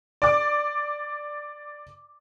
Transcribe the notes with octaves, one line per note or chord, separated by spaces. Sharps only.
D5 D6